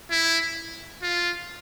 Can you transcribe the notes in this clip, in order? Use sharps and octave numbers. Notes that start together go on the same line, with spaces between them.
E4
F4